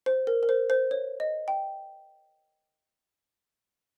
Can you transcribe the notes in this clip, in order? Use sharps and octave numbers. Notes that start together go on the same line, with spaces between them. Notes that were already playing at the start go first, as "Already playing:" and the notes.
C5
A#4
A#4
C5
C5
C#5
D#5
G5